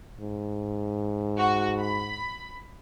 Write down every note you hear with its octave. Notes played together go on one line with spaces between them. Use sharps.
G#2
F#4
B5